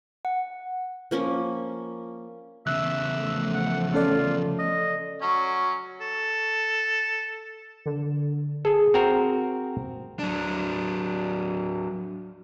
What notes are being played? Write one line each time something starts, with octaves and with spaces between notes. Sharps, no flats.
F#5
F3 A#3 C#4
E2 C#3 E5 F#6
F3 A3
F#5
C#4 F4 A4 D5
D#5
F#3 C#4
A4
D3
G#4 A4
C4 F#4 A#4
F#3 D4